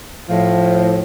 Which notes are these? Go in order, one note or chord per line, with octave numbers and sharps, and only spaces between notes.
A2 F3